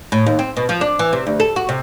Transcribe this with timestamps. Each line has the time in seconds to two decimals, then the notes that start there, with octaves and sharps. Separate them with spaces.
0.12 A2
0.26 D#2
0.39 C4
0.57 B2
0.69 F3
0.81 D4
0.99 E3
1.13 C3
1.27 D2
1.40 A4
1.56 F#4
1.69 C3